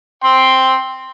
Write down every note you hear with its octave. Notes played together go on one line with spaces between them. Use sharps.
G5 C6